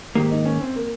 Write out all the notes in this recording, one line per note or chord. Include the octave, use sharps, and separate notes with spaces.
G#2 D#3 A#3 G4
D#4
C#4
C4
A#3